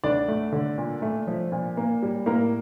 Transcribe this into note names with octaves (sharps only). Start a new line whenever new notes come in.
D2 D4 D5
A3
D3
A#2
A3
F3
A#2
A#3
G3
A2 A#3 A#4